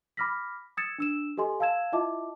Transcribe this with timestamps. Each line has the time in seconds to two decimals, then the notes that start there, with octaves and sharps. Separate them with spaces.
0.17 B5 D6 F6 A#6 B6
0.77 D#6 E6 G#6 A6 C#7 E7
0.98 D4 E6 E7
1.37 G4 A4 D#5 G#5 C6
1.60 F5 A5 E6 G#6 E7
1.92 E4 F4 D#5 E5 A5 D6